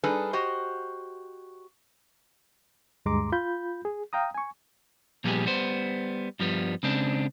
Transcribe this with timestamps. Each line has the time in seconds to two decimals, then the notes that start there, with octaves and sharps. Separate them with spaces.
0.04 G3 D4 D#4 G#4 A4 B4
0.33 F#4 G4 C5 D#5
3.06 D2 G2 G#3 A#5 C6 D6
3.32 F4 B5 G6
3.85 G#4
4.13 F5 G5 A#5 D#6
4.35 G#5 C#6
5.24 A#2 F3 G3 B3 G4 G#4
5.46 G3 B3 C5
6.40 G2 F3 G3 B3
6.83 C#3 G#3 C4 D4